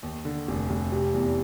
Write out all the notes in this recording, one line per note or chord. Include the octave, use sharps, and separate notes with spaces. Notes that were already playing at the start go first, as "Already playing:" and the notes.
D#2
D3
F1
F1
C3
E2